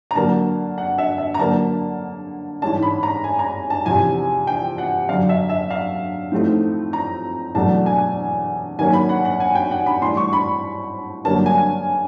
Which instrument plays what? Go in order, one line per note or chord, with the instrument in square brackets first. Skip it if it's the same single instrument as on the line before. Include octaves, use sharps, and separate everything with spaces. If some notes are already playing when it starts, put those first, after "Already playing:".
[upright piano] A#5
D3 F#3 A#3 A5
F#5
E5
E5
A#5
D3 F#3 A#3 A5
G#2 E3 G#3 C#4 A5
B5
A#5
G#5
A#5
A5
E2 C3 F3 G#5
G5
F#5
F#2 D3 F#3 F5
E5
E5
F5
A2 F3 A3 C4 D#4
A#5
E2 B2 F#3 A3 D4 A5
G#5
D#3 F#3 A#3 C#4 G#5
B5
F#5
F#5
G#5
G5
F#5
B5
A2 E3 G3 C6
C#6
B5
G2 D3 F#3 A#3 C#4 A5
G#5